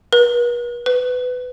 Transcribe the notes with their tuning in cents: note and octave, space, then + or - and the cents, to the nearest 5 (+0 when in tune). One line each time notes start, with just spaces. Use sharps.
B4 -45
B4 +20